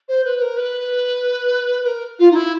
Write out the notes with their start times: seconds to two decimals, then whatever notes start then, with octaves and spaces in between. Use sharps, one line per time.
0.08 C5
0.24 B4
0.41 A#4
0.57 B4
1.83 B4
1.86 A#4
2.19 F4
2.31 D#4
2.35 E4